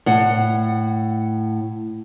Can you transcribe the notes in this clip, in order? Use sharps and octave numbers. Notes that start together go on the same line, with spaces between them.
A2 F#5